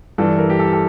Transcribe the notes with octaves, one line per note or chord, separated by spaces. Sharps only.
G2 E3 A4
A#4
G4
A4
A4